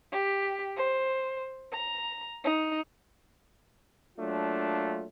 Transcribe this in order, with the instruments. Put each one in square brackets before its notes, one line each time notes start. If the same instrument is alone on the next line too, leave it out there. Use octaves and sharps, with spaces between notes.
[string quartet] G4
C5
A#5
D#4
[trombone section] F#3 A3 A#3 D4 F4